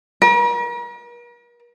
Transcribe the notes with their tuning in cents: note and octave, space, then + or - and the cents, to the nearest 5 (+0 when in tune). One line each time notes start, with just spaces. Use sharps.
A#4 +45